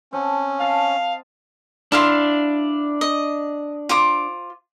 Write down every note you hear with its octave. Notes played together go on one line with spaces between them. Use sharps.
C4 C#4 F#5 A5
D#5 F5 A5
D4 E4 F5 C6
D#5
F4 C5 D6